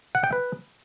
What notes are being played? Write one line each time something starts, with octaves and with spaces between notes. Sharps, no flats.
F#5
G5
B4